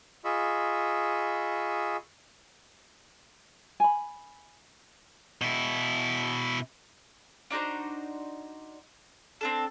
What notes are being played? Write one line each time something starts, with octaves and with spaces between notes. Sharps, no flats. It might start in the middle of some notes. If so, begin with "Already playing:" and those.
F4 G#4 D#5 B5 C#6 E6
G#5 B5
B2 E4
D4 D#4 F#4 C5
C4 D4 A4